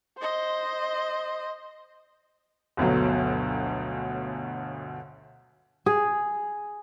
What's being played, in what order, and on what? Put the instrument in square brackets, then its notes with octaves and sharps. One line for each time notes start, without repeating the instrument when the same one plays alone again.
[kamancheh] C5 D#5
[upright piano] G1 D2 B2 F#3
[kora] G#4